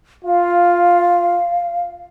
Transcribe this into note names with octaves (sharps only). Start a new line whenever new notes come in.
F4 F5